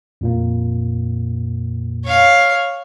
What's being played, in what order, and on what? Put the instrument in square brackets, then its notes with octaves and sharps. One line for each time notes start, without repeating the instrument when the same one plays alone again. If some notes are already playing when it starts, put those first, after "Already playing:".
[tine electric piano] F2 A#2 A#3
[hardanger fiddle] C#5 F5